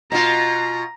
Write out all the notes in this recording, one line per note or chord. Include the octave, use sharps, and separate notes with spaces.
B2 F4 A#5